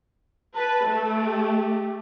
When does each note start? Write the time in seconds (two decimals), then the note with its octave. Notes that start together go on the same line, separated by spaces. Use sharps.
0.56 B4 A5
0.87 A3
1.24 G4